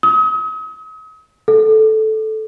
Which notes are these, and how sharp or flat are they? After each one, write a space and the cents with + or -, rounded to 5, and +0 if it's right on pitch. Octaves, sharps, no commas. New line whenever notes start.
D#6 +40
A4 -10